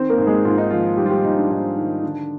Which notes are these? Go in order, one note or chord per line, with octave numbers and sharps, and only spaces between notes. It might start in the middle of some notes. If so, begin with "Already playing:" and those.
Already playing: D#3 C4 C5
A#3 A#4
G#2
G#3 G#4
G#2 F4
D#4
D#3 F3 F4
D#3 G3 G4
F4
G3 G4
G#2 D#4
D4
G#2 D#4
D#3
D3 D4